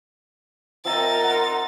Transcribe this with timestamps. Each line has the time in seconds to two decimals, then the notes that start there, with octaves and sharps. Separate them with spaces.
0.85 F3 C4 D#4 A#4 E5 A6
1.23 F#5 C6